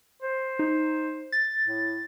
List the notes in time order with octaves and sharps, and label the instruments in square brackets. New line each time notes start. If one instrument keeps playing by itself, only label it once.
[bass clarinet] C5
[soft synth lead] D#4
A6
[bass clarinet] A2